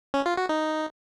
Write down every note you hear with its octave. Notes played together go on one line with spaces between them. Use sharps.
C#4
F4
F#4
D#4